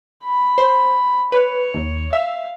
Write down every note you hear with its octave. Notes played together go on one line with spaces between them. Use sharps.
B5
C5
B4 C#5
D#2
E5 F5